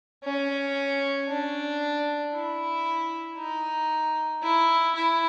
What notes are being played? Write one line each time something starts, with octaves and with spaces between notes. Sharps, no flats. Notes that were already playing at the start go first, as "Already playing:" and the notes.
C#4
D4
E4
D#4
E4
E4